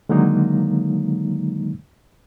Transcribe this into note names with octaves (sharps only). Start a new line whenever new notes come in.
D3 D#3 F#3 G#3 A#3 D#4